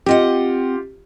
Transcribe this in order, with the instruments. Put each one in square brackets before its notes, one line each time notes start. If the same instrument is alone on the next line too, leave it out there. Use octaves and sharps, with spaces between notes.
[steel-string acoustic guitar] C4 D#5 F#5 [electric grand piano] F4 G4